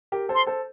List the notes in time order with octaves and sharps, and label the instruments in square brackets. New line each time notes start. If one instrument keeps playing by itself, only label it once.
[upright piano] G4 A#4
A4 C5
[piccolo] C6
[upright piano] A4 C5